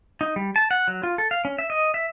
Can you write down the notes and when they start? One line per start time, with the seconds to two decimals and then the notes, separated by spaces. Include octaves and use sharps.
0.21 D#4
0.36 G3
0.56 A5
0.71 F#5
0.88 F#3
1.03 F4
1.18 A4
1.31 F5
1.45 C#4
1.58 E5
1.70 D#5
1.94 E5